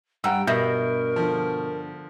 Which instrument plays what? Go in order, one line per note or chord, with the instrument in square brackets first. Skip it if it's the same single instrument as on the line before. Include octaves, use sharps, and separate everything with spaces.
[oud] G2 G3 [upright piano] F#5 A#5 E6 [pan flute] G5
[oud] G2 D#5 E5 [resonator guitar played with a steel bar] B2 [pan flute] A#4 [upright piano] G6
[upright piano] D3 F3